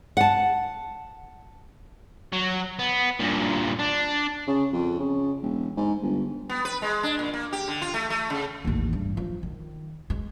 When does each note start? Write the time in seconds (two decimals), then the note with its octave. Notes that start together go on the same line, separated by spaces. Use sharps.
0.17 F#5 A5
2.32 F#3
2.79 B3
3.20 G2 A#2
3.79 D4
4.47 C#3
4.72 F2
4.99 C#3
5.42 E1
5.77 G#2
6.02 G1
6.50 B3
6.65 B4
6.82 G#3
7.03 D4
7.19 A#2
7.33 A#3
7.53 G4
7.68 D3
7.82 F4
7.94 A3
8.10 A3
8.30 C#3
8.65 A1 D#2
8.93 G2
9.17 F3
9.43 D#3
10.10 G#3